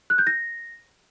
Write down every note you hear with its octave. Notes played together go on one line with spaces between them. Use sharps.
F#6
G6
A#6